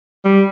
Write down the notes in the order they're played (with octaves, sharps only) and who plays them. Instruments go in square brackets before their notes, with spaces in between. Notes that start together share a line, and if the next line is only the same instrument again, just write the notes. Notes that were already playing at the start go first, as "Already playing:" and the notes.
[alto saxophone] G3